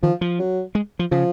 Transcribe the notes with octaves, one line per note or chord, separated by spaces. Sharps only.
D#3 F3
F3
F#3
G#3
F3
C#3 F3